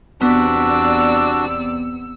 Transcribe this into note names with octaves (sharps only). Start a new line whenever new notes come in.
E2 C3 B3 D4 F#4 D5 E6